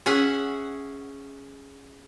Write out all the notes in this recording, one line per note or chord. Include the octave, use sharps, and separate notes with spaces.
C#4 G#4 E5 F#5 G#5